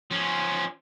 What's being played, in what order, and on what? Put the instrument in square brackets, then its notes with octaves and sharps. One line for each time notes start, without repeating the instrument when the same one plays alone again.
[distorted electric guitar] F3 C#4